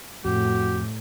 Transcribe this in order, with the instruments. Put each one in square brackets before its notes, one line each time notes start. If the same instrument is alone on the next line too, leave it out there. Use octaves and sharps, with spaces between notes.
[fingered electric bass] F2 [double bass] A2 [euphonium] F#4 [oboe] G4